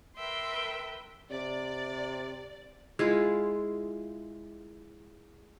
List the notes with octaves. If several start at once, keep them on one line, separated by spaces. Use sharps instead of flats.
A#4 B4 E5 G5 C6
C3 D5
G#3 E4 F4